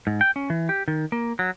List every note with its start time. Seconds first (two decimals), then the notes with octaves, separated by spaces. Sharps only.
0.07 G#2
0.21 G5
0.36 C#4
0.50 E3
0.69 G4
0.88 D#3
1.12 A#3
1.39 F#3